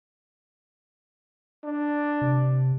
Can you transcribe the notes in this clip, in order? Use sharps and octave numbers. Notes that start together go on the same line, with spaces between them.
D4
C3